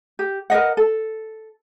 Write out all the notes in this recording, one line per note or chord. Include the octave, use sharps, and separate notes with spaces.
G4
A#4 B4 D#5 F#5
A4